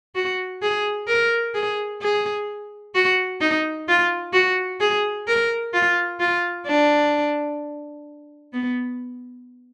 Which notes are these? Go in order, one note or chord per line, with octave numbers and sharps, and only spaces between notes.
F#4
G#4
A#4
G#4
G#4
F#4
D#4
F4
F#4
G#4
A#4
F4
F4
D4
B3